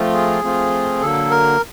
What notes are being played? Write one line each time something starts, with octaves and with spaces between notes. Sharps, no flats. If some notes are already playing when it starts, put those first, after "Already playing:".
Already playing: F3 A3 C4 F4
G#4
F3 A3 C4 F4
D3 F#3 A#3 A4
A#4